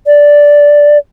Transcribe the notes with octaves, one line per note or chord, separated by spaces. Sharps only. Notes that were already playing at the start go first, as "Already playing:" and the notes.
D5